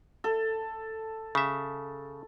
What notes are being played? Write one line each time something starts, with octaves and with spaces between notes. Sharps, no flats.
A4
C#3 E5